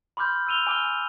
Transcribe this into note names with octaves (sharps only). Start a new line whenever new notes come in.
B5 C6 D6 F6 G6
E6 F6 D#7 F7 G7
G#5 D6 F6 G7